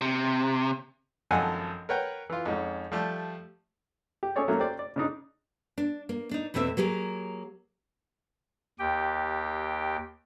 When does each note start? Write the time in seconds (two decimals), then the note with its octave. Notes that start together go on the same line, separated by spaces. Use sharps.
0.01 C3
1.31 G#1 F#2 F3 A4 F#5 G#5
1.89 A#4 B4 C#5 F#5 G5
2.30 E3 F4
2.46 F2 G#2 C#4
2.92 F3 G3 A3 G4
4.23 G4
4.36 C#4 G#4 A4 C#5 D5
4.48 F#3 A3 A#3 C#4
4.60 G4 C5 D5
4.79 D5
4.96 C#3 D4 D#4
5.78 D4
6.09 A#3
6.31 D4 D#4
6.54 E2 B2 A3 C4 G#4 E5
6.77 F#3 A#3 G4 G#4
8.79 D#2 G4 G5